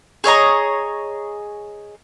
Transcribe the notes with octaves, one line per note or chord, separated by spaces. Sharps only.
G#4 C#5 D#5 A#5